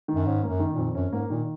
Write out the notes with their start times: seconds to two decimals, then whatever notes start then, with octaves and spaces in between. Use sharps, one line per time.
0.08 D#3
0.14 F#2
0.26 G#2 C#4
0.43 F#2 A#3
0.59 D#3
0.72 A#2
0.78 F2
0.95 F#2 C#4
1.12 G#2 A#3
1.30 A#2 D#3